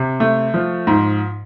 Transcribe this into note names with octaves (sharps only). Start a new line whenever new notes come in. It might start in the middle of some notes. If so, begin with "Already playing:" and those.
Already playing: C3
A3
F3
G#2